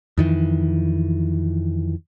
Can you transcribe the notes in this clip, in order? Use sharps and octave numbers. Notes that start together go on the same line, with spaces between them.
F2 D#3 E3